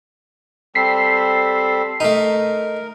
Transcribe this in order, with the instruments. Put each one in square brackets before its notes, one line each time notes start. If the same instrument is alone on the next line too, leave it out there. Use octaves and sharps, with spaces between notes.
[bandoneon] G3 C4 A4 [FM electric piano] B6 C7
[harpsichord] A3 D#4 [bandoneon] A#4